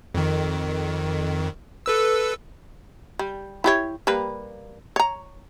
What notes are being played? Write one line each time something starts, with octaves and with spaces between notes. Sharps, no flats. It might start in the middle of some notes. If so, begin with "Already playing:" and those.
F2 D#3
A4 B4 E6
G3
E4 G4 C#5
G3 A#3 B4
C#5 A#5